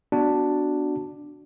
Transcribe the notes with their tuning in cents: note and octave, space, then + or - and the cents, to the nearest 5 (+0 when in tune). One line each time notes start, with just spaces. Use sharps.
B3 +0 D4 +0 F#4 +0